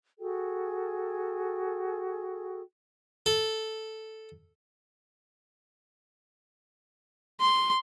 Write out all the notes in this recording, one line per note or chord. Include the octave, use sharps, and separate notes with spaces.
F#4 G#4 A4 G5
A4
C6